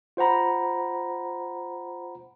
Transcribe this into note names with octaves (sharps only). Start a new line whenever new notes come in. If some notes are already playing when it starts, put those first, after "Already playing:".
F4 C5 F#5 A#5 B5